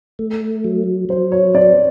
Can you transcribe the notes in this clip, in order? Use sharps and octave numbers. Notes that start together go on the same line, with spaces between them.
A3
F#3
F#3 C5
C#5
C4 D5